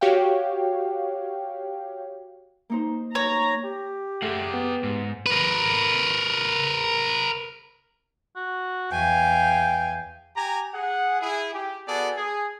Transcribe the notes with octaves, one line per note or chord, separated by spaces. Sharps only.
F#4 G4 C#5 F5 G5
A#3 D#4 C5
C#5 A#5
G4
A3 G#4 F#5
B3
G#2
A#4 B4
F#4
E2 F5 G5 G#5
G4 G#5 A#5
G#4 F#5
E4 G#4
G4
B3 F#4 G#4 A4 D5
G#4